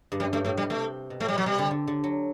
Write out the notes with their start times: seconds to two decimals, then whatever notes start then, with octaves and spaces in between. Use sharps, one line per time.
0.12 G2
0.20 F#2 G3
0.33 G2 A3
0.45 A2 A3
0.57 B2 G3
0.70 C3 A3
1.10 B2
1.20 A2 A3
1.28 G3
1.33 B2 F#3
1.46 C3 G3
1.58 D3
1.71 D3
1.87 D3
2.04 F#3